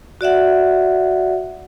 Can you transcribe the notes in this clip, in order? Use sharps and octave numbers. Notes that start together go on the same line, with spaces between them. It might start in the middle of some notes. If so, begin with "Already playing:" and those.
F#4 D5 E5 F#5